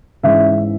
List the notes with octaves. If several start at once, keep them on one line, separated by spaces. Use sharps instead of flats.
G#2 E3 G#3 C#4 E5